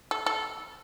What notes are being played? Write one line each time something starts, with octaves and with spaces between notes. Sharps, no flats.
A4
A4